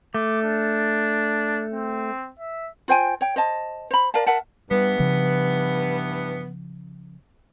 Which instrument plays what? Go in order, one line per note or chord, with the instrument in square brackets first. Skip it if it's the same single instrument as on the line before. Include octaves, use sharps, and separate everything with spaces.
[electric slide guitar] A3 [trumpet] D6
[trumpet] D4
C4
E5
[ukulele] F4 C5 G5 G#5
C#5 G5
C5 D#5 A5
C5 B5
A#4 D5 F5 A5
A#4 E5 F#5 A5
[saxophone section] G2 E3 B3 [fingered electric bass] G3
[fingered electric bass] C#3 F3